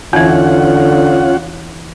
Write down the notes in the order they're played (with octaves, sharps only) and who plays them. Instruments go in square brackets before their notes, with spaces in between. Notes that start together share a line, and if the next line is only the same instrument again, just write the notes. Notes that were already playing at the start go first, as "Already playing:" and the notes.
[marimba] E2 E3 [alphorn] D3 [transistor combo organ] C#4 F4 F#5